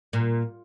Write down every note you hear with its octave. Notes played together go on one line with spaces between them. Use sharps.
A#2